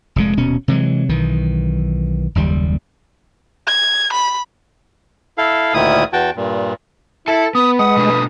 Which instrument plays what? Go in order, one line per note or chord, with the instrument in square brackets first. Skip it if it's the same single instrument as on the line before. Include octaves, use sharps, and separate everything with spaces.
[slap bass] F1 A#2 G#3
D#1 B2 C#4
C3 E3 F#3 G#3
B1 D#3 E3
F#1 D#2 G3
[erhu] G#6
B5
[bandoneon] E4 A4 F5
D2 A#2 D#3 E4 D#6
E2 F#4 G5 A5
G2 A#2
[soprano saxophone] E4 [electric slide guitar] A4 A5
[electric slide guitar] B3 [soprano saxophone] B4 [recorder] D#6
[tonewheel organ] G#3 [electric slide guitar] F#5 [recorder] D#6
[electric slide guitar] B2 A3 D4